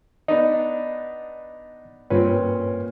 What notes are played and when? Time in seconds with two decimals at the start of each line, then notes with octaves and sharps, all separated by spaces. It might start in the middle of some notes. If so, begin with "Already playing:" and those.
0.28 B3 D4 D#4 D#5
2.10 G2 A#2 C4 C#4 B4